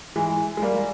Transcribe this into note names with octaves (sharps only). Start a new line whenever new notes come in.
E3 G#3
G#3
G3 A#3